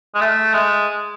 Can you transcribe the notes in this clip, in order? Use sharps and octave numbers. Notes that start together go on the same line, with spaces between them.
G#3
A3
G#3